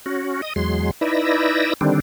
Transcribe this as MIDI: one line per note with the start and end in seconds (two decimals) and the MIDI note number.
0.06 0.41 61
0.06 0.41 66
0.42 0.53 75
0.42 0.53 87
0.56 0.91 40
0.56 0.91 54
0.56 0.91 56
0.56 0.91 84
1.01 1.74 63
1.01 1.74 64
1.01 1.74 71
1.01 1.74 74
1.01 1.74 88
1.01 1.74 94
1.81 2.00 50
1.81 2.00 51
1.81 2.00 55
1.81 2.00 60
1.81 2.00 62